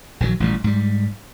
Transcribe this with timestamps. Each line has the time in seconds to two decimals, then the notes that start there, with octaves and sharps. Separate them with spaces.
0.20 A#1 D#3 E3 F#3
0.40 A1 A#2 F3 G3
0.64 G#2 G3